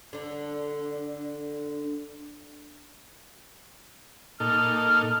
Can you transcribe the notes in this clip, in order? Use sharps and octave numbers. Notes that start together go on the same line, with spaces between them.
D3 D4
A#2 D#4 A4 F6